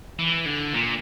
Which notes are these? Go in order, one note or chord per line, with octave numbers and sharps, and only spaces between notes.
E3
D3
A#2